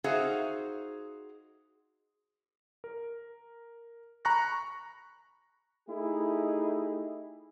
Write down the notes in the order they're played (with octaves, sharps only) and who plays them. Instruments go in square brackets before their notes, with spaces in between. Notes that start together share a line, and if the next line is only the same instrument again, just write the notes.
[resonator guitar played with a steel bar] D#4 F#4 G#4 C5 E5 F5
[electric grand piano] A#4
A#5 B5 C#6 F#6 A#6
[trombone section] A3 D#4 E4 G4 G#4